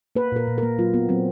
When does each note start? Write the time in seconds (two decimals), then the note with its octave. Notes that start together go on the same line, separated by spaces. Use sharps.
0.16 A#3 B4
0.32 A#2 A#4
0.47 A#2
0.58 A#4
0.63 A#3
0.78 F#3 F4
0.93 A#3 B3
1.09 F#3 C4